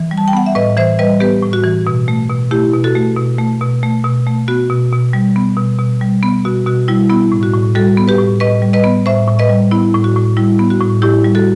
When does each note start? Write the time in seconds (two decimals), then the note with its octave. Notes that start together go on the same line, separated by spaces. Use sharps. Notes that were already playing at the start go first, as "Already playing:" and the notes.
Already playing: E3
0.11 G3
0.18 A5
0.28 G5
0.33 B3 F#5
0.46 E5
0.55 A2 B4 D#5
0.77 E3 C5 E5
0.99 G3 B4 D#5
1.20 B3 G4 B4
1.43 A2
1.53 F#4
1.64 E3
1.87 B2
2.08 A3
2.29 B2
2.51 A3 E4 G4
2.74 B2
2.84 F#4 A4
2.95 A3
3.17 B2
3.38 A3
3.61 B2
3.83 A3
4.04 B2
4.27 A3
4.48 B3 F#4
4.70 B2
4.92 B2
5.13 G3
5.36 B3
5.57 B2
5.79 B2
6.01 G3
6.23 B3
6.45 B2 F#4
6.66 B2 F#4
6.88 G3 E4
7.10 B3 E4
7.32 A2
7.43 F#4
7.53 A2
7.75 G3 F#4 A4
7.97 B3
8.08 G4 B4
8.18 A2
8.40 A2 B4 D#5
8.62 G3
8.73 B4 D#5
8.84 B3
9.06 A2 C5 E5
9.28 A2
9.39 B4 D#5
9.49 G3
9.71 B3 E4
9.94 A2
10.04 F#4
10.16 A2
10.37 G3 E4
10.59 B3
10.70 F#4
10.81 A2
11.02 A2 E4 G4
11.25 G3
11.35 F#4 A4